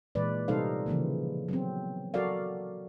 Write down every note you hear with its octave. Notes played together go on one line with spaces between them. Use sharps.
A#2 E3 G#3 B4 D5
C3 G3 D#4 A4 C5 F5
C#3 E3 F3 A#3
F#3 B3 C4
F#3 F#4 A4 A#4 D5 F5